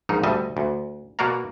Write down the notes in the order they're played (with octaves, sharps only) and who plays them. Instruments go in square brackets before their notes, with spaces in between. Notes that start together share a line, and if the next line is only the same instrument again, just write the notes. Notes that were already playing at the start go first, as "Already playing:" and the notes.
[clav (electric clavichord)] A#1 G#2 D#4
D2 G3 D#5 E5 A5
D2
B2 A#3 F#4 D5 F5 A#5